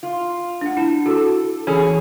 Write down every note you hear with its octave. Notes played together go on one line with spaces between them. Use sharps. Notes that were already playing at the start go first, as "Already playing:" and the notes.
F4
D4 F#5
E4 A5
F#4 A4
E3 C#4 G#4 G#5 B5